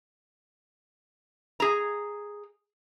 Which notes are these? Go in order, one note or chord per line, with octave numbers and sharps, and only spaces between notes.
G#4 A#5